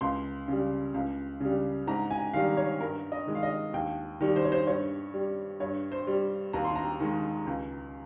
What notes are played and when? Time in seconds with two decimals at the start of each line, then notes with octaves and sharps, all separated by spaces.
0.01 C#2 C6
0.48 C#3 G3
0.94 C#2
1.40 C#3 G3
1.87 G#2 A#5
2.11 G#5
2.33 D#3 G3 F5
2.57 C#5
2.80 G2 A#4
3.12 D#5
3.27 D#3 G#3
3.35 F5
3.43 D#5
3.74 D#2 G5
4.21 D#3 G3
4.36 C5
4.44 C#5
4.52 C5
4.67 G2 C#5
5.14 G3
5.60 G2 C#5
5.92 C5
6.07 G3
6.53 D#2 A#5
6.64 C6
6.76 A#5
7.00 D#3 G#3
7.47 C#2